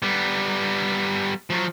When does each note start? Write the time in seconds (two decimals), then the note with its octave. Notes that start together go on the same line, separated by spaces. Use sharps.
0.02 G3 B3
1.50 F3 F#3